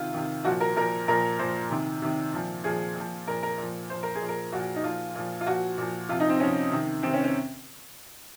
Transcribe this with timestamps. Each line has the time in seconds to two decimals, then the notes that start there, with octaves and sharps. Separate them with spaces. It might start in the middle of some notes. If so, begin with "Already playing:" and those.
Already playing: C3 D#3 F4
0.14 C3 D#3
0.45 A#2 F3 F#4
0.60 A#4
0.76 A#2 F3 A#4
1.08 A#2 F3 A#4
1.39 A#2 F3 C5
1.70 C3 D#3
2.02 C3 D#3
2.33 A#2 F3
2.64 A#2 F3 G#4
2.95 A#2 F3
3.27 A#2 F3 A#4
3.43 A#4
3.58 A#2 F3
3.90 A#2 F3 C5
4.03 A#4
4.15 G#4
4.22 A#2 F3
4.29 A#4
4.52 A#2 F3 F#4
4.76 D#4
4.83 A#2 F3 F4
5.15 A#2 F3
5.41 F4
5.46 A#2 F3 F#4
5.78 A#2 F3
6.09 C3 F3 F4
6.20 D#4
6.29 C4
6.40 C3 F3 C#4
6.72 C3 D#3
7.03 C3 D#3 C4
7.13 C#4
7.24 C#4